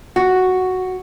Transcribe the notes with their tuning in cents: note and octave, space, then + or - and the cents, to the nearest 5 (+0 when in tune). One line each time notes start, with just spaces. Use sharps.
F#4 +0